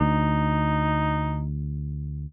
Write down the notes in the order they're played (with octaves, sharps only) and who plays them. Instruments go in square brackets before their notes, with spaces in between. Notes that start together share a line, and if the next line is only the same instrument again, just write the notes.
[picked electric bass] D2 [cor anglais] D#4